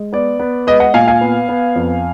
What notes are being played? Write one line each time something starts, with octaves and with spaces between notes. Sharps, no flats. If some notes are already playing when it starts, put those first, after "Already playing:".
Already playing: G#3
B3 D5
B3
G#3 B4 D#5
D#5 F#5
A#2 F5 G#5
F5 G#5
B3
B3
F2